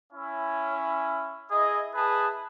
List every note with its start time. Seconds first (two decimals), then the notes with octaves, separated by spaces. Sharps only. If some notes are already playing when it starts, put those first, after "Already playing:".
0.13 C#4 E4
1.51 E4 G#4 D#5
1.95 E4 G#4 B4 A5